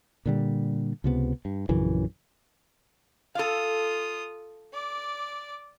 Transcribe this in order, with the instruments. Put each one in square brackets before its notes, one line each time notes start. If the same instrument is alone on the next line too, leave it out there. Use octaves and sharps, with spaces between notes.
[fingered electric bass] A#2 D3 G3
C#2 C3 B3
G2
A#1 F#2 C#3 E3
[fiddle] F4 D#6 [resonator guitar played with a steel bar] A4 F5
[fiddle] D5 D6